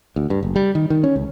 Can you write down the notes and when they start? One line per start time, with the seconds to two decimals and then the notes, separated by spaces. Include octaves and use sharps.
0.16 D2
0.30 G2
0.43 F#1
0.56 G3
0.75 D#3
0.90 D#3
1.04 C#4
1.16 C#2